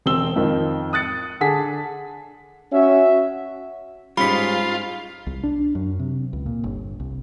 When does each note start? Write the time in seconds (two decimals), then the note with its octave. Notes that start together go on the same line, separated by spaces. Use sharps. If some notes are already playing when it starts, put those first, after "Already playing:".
0.06 E1 C4 E6 G7
0.36 F2 D#3 F3
0.93 D#6 F#6 A6 C#7
1.41 D3 G#4 A5 B6
2.72 C#4 F#4 E5
4.17 G#2 G3 C#4 D#4 F4 B5 B6
5.27 C2
5.43 D4
5.75 F#2
5.99 C3
6.33 C#2
6.46 A#2
6.64 G1
7.00 C2